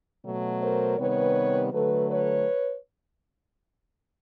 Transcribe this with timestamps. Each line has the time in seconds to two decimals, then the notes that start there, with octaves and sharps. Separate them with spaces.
0.24 B2 F#3 A3
0.62 A#4 C5
0.98 C3 D#3 G3 B3 B4 C#5
1.72 D3 F#3 A3 A4 B4
2.09 B4 C#5